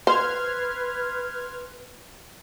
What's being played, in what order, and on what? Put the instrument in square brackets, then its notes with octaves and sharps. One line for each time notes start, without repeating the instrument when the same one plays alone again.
[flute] B4 [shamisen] C5 [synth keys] C6 F6 G#6